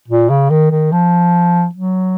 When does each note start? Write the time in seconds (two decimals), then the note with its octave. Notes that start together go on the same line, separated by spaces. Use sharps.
0.08 A#2
0.30 C#3
0.50 D#3
0.71 D#3
0.92 F3
1.75 F#3